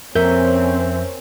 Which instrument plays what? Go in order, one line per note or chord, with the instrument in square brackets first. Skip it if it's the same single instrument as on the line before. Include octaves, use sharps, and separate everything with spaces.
[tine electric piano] F2 E5 G6 [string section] C4 C#4 [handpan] A#4